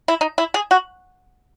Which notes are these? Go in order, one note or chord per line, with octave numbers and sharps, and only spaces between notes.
E4
D#4
E4
G#4
F#4